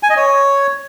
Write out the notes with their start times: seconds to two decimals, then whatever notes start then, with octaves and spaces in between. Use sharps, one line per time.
0.03 G#5
0.10 D#5
0.17 C#5